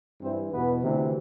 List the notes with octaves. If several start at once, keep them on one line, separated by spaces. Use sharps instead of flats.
G2 E3 C4 C5
E2 B2 B3 B4
D2 C3 E3